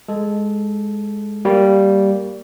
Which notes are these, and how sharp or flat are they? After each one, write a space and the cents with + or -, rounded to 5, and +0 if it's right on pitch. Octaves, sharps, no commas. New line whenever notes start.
G#3 +0 A4 -15
G3 -5 A#3 +0 C#6 +30